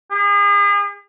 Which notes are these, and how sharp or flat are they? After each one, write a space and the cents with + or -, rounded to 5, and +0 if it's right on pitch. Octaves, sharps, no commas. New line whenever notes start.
G#4 -40